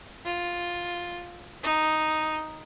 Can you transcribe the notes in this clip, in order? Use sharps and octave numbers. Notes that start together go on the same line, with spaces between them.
F4
D#4